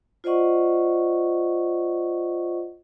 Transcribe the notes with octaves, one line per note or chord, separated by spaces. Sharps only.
F4 C5 D5 D#5 F#5 C#6